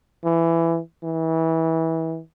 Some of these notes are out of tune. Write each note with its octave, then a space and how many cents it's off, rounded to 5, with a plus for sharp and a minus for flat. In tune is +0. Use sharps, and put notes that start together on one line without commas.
E3 +15
E3 -25